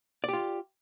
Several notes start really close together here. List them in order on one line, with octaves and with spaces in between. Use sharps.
D5 G4 F4